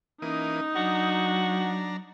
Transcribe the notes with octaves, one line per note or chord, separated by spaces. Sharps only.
E3 A#3 C#4 D#4 D#6
F#3 D4 F#4 A#5